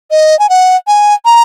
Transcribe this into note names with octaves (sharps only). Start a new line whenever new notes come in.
D#5
G#5
F#5
G#5
A#5